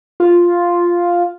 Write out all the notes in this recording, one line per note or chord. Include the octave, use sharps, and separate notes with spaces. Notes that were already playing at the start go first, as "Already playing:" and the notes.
F4